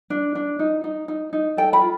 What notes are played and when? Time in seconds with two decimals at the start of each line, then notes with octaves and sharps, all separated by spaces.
0.10 D4
0.35 D4
0.59 D#4
0.84 D#4
1.08 D#4
1.33 D#4
1.57 A4 G5
1.73 B5
1.81 F4